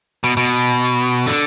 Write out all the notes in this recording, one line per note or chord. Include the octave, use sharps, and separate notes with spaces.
B2
B2
D3